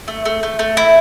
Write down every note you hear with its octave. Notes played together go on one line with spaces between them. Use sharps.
A3
A3
A3
A3
E4